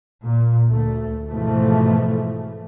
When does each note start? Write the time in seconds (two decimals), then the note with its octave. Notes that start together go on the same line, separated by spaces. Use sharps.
0.25 A#2
0.69 D2 A3
1.29 G#2 B2 E3 F3 A3